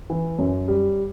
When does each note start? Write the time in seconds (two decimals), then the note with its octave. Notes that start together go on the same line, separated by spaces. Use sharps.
0.10 E3
0.39 F#2
0.68 G3